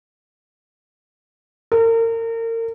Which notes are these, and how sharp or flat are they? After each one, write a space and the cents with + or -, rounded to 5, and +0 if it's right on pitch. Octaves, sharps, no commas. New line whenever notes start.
A#4 -35